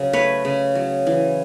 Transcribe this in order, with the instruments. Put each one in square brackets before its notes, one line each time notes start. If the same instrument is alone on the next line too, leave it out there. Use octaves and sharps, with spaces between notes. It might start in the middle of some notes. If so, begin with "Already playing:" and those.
Already playing: [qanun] C#3 F#3
A3 B4 C#5
C#3
F#3
E3